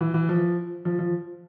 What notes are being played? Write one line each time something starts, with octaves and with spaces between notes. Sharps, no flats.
E3
E3
F3
F3
F3